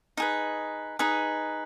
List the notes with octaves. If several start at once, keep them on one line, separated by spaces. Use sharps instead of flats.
D#4 G#4 B4
D#4 G#4 B4